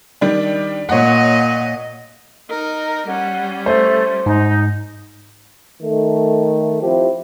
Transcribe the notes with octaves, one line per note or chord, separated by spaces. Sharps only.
D#3 G3 D4
A#2 C#5 D#5 F#5
D#4 A#4 D#5
G3 C#4 F#5
A3 C5
G#2 D#4
D#3 A3
F3 C4 E4 G4